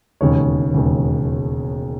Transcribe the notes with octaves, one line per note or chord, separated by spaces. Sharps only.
E1 D#2 C#3 C#5
E1 D#2 C#3